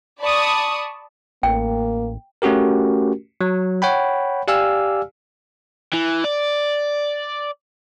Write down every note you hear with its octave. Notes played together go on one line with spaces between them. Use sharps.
D5 A5 B5 C#6 D#6
A1 A#3 G5
A3 C#4 F#4 G4 A#4
F#3
C#5 F#5 G5 B5
G4 D5 F5 G#5 E6 F6
E3
D5